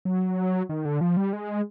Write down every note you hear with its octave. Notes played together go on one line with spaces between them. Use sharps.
F#3
D#3
D3
F3
G3
G#3